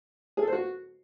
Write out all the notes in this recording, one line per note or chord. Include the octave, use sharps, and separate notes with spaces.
G#4
A4
C5
F#4